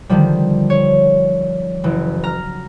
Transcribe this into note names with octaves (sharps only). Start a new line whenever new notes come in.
D3 D#3 F3 G3
C#5
F#1 E3
A#5 F6